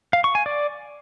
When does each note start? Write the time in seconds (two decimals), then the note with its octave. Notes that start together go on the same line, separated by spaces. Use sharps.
0.13 F5
0.24 C#6
0.35 G#5
0.46 D5